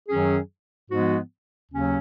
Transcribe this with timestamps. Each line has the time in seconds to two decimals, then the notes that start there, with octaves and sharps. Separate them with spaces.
0.09 F#2 D#3 F#3 C#4 G#4
0.90 G#2 F3 G#3 B3 F#4
1.70 D#2 C#3 F#3 C#4